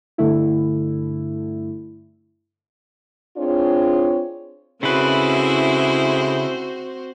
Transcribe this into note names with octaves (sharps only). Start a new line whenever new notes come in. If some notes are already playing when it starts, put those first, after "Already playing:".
G2 D3 A3 E4
C4 D4 F4 G#4 C#5
C#3 G#3 A3 C4 E4 F#4 B4 C5